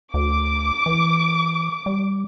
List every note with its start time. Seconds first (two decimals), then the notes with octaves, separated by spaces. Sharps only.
0.14 D2 D6
0.86 E3
1.86 G3